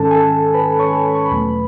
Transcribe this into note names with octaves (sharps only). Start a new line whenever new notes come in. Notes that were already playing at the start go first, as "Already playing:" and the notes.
Already playing: G#2 D#3 G#3 C#4 A4 A5
G#5
A4 A5
B4 B5
C#5 C#6
B5
C#6
B4 B5
E2 B2 F#3 A3